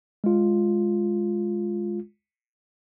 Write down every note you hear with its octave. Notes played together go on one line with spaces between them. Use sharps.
G#3 F4